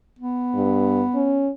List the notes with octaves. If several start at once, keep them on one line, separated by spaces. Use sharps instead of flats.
B3
G2
C#4